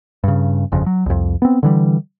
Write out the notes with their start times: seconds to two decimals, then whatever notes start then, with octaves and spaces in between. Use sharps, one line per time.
0.24 G2 C#3
0.72 G1 F2 C#3
0.86 F#3
1.06 C2 F2
1.42 B3 C4
1.63 D3 E3 G3